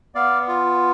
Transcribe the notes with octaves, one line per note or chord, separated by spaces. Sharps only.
B3 D5 F5
F4